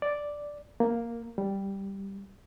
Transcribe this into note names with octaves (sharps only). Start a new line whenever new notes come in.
D5
A#3
G3